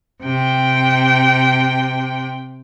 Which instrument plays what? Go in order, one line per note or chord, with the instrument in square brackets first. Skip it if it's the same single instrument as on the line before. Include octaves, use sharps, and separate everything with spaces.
[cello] C3 G5